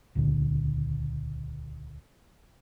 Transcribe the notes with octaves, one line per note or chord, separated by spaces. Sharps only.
D#1 C#2 A#2 D3